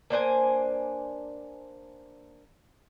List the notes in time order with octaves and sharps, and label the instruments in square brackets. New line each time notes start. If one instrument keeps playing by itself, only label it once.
[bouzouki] A#3 D4 C5 G#5